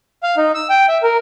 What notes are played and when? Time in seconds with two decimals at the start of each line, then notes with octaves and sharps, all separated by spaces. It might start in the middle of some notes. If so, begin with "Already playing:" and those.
0.23 F5
0.37 D#4
0.55 E6
0.69 G5
0.88 E5
1.03 A#4